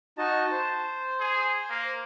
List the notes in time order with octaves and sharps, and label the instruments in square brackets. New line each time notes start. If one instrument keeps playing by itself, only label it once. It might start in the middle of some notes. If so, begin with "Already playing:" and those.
[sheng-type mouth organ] D#4 F#4 D#5 [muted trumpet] A5
[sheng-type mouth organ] C5
[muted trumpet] G#4
A#3